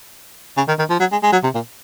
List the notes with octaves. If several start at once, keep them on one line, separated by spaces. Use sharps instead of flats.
C#3
D#3
D#3
F3
F#3
G#3
G#3
F#3
C3
A#2